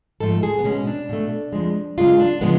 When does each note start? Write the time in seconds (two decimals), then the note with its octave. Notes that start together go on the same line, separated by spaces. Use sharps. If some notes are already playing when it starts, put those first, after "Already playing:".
0.20 G#2 F3 A3 A4
0.43 G#4
0.59 B3
0.64 B2 G#3 C#4
0.87 D4
1.09 B2 A3
1.53 F2 F3 G#3
1.98 F#2 C#3 G#3 F4
2.19 D4
2.41 C#3 F3 G#3 B3